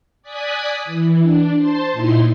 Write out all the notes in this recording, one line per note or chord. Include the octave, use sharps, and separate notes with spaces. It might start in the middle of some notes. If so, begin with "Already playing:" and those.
D5 G#5 D#6 F#6 G#6 B6
E3
D4
C5 A5 C6
A#2 D#4 E4 C6